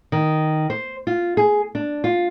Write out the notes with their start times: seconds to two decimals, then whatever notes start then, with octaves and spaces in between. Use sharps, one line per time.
0.12 D#3
0.70 C5
1.07 F4
1.37 G#4
1.75 D4
2.04 F4